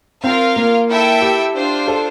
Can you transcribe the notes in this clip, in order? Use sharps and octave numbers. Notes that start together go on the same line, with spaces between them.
C4 F4 A#4 F5
A#3
E4 A4 E5 G5
G4
D4 F4 C5
A4